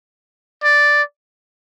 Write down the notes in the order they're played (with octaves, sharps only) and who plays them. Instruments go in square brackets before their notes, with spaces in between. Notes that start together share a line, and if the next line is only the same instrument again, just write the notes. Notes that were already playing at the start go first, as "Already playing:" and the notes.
[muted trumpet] D5